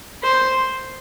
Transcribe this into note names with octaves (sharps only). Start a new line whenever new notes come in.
C5